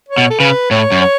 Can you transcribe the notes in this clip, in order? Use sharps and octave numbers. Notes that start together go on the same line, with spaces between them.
C#5
B2
A4
C#3 B4
A2 C#5
F#2
C#5